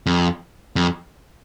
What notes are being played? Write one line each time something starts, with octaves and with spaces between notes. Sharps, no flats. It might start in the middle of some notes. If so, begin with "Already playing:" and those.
F2
F2